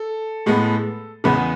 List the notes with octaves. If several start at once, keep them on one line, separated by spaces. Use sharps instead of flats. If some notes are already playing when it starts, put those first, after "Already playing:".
Already playing: A4
A2 G#3 B3
E2 C#3 G#3 B3 B4